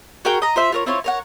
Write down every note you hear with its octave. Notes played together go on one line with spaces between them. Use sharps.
F#4 G#4 A#4 G5
D#5 A#5
F4 C5 E5
F4 A#4 C#5
C4 E4 F4 C#5
A#4 C#5 F#5